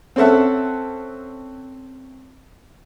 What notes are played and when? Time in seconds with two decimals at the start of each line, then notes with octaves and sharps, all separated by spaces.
0.16 C4 C#4 A4 E5 F#5